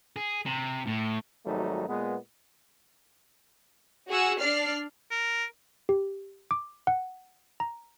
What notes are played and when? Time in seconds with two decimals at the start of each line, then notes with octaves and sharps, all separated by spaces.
0.16 G#4
0.46 C3
0.87 A2
1.46 G#1 F#3 G3 A3 D#4
1.88 A#2 G#3 B3
4.08 F#4 G#4 F#5 E6
4.40 D4 D5 F6 C7
5.11 A#4
5.89 G4
6.51 D6
6.87 F#5
7.60 A#5